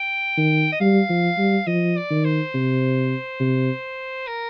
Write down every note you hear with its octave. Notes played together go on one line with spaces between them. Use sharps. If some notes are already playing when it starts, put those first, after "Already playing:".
Already playing: G5
D#3
D#5
G3 F5
F3
G3
F3 D#5
D5
D#3
C5
C3
C3
A#4